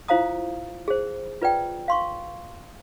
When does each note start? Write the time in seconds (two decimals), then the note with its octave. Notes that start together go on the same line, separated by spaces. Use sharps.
0.08 E4 F4 C5 F5 A#5 D#6
0.88 G#4 C5
1.42 F4 B4 D5 G5
1.88 F5 C6 C#6